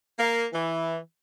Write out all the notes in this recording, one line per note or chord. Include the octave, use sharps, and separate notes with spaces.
A#3
E3